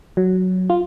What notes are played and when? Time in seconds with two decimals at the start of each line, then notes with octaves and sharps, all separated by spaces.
0.17 F#3
0.70 F4